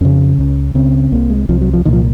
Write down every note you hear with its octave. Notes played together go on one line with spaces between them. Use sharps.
F2 C#3 C#4
C#2 C#3
C#2 C#3 C4
C2 C3 A#3
G#3
C2 C3 F3
F#3
F3
C2 A#2 D#3
F3